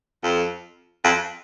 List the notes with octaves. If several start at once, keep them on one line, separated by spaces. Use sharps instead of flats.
F2
F2